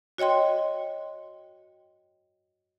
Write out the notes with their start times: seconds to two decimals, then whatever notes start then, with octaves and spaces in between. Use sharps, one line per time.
0.18 F#4 C#5 D#5 G5 C6